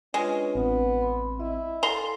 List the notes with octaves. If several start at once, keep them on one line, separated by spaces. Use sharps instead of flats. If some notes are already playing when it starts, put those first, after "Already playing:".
G#3 C#4 D4 F4 B4
A1 B3 C4
B5 C6
E4 D#5
A4 F5 G#5 A#5 C6